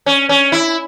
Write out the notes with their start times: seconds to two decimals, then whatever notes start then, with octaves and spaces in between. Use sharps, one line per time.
0.06 C#4
0.29 C#4
0.52 E4